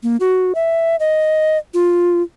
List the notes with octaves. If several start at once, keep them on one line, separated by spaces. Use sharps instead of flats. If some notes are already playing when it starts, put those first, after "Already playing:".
A#3
F#4
E5
D#5
F4